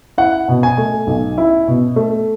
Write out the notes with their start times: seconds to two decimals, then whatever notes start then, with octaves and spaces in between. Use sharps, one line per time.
0.18 E4 F#5
0.48 B2
0.63 G#5
0.78 A3
1.07 B1
1.38 E4
1.68 B2
1.96 A3